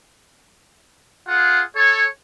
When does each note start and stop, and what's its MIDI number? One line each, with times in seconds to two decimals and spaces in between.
1.27 1.62 65
1.27 1.62 68
1.27 1.62 78
1.75 2.05 69
1.75 2.05 73